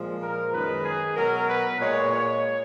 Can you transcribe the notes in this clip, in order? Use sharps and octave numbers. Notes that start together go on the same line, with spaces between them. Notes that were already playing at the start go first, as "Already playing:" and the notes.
Already playing: A#2 F3 G#3
A#4
F#2 D#3 G#3 B4
G#4
B2 F#3 A#4
B4
A#2 G#3 C#5